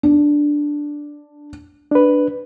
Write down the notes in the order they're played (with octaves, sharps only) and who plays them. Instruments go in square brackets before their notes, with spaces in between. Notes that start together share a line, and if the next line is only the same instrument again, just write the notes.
[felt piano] D4
[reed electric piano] D4 B4